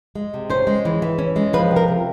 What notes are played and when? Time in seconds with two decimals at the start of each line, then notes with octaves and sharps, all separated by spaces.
0.15 G#3
0.34 C3
0.50 C#4 C5
0.67 G#3
0.85 E3
1.02 E3
1.19 C#4
1.36 G#3
1.53 F3 B4
1.71 C3
1.76 A#4
1.88 C3